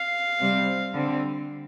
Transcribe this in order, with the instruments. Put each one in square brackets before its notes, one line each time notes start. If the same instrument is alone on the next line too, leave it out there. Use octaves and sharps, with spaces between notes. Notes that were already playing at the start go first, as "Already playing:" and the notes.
Already playing: [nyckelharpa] F5
[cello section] C3 G3 C4
D3 G3 C4